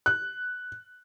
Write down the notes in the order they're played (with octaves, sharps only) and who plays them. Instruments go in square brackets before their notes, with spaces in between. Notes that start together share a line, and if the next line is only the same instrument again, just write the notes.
[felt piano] F#6